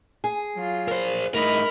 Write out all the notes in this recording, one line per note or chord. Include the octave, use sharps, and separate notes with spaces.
G#4
F#3 F4
A#4 C5
A2 D#4 A#4 B5